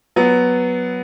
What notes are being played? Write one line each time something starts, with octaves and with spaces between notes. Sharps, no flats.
F#3 B3